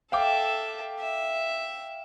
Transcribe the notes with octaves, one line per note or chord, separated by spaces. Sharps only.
A4 E5 F5 G5 D6
E5